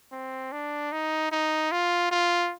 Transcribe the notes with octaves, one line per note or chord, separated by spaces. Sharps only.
C4
D4
D#4
D#4
F4
F4